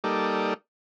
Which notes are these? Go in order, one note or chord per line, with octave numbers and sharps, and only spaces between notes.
G3 A#3 D#4 A4 D5